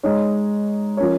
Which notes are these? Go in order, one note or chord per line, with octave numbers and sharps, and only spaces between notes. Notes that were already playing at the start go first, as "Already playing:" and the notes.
G#3 D#4 C#5
F3 C#4 A#4 C#5